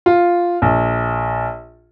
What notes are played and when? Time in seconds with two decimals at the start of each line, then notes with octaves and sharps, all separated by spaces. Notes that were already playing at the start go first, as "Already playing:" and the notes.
0.06 F4
0.62 A#1